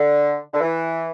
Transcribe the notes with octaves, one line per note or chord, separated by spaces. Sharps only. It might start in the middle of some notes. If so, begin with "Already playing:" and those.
Already playing: D3
D3
E3